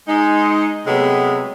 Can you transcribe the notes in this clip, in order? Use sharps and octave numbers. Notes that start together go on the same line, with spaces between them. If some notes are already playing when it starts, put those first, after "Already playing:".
G#3 D#4
C3 F#3 G#3 A3 B3